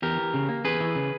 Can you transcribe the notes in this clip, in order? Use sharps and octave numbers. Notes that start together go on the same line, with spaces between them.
E2 G4 A#4
E3
C#3
A#3
E2 G#4 B4
E3
C#3